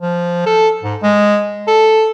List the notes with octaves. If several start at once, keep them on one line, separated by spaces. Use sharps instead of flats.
F3
A4
G#2
G#3
A4